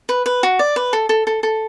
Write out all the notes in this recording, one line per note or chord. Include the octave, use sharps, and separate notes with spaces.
B4
B4
F#4
D5
B4
A4
A4
A4
A4